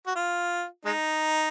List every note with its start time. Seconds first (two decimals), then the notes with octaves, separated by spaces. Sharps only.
0.07 F#4
0.16 F4
0.85 G#3 D#4